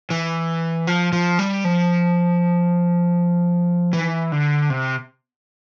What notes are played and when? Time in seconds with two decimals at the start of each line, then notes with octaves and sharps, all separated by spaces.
0.10 E3
0.87 F3
1.13 F3
1.39 G3
1.65 F3
3.93 E3
4.32 D3
4.70 C3